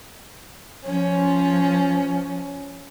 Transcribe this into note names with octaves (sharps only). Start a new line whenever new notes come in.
F3 C#4